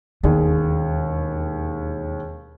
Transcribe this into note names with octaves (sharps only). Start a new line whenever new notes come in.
E1 D#2 D#3 G#4